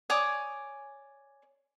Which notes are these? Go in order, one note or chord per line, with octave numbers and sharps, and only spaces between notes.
C#5 D5 G#5 D#6